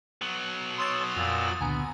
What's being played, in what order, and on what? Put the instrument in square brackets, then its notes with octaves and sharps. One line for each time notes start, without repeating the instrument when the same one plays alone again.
[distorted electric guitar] F#3 B3
[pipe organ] C#5 E6 [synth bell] C6 D#6 A6
[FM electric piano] F2 G#5 [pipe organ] A#2 E6 A#6
[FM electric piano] C#2 A#2 D3 [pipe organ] B3 [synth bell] G#5 A#5